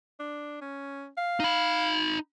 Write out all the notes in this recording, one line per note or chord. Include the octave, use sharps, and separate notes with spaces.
D4
C#4
F5
D#4 B5